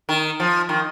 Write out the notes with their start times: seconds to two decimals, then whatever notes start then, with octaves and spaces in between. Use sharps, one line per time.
0.09 D#3
0.40 F3
0.69 D#3